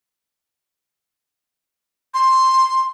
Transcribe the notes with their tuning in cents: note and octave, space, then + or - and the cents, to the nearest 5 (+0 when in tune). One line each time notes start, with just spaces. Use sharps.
C6 +5